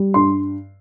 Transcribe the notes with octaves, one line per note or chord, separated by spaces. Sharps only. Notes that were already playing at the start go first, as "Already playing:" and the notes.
Already playing: G3
G2 C6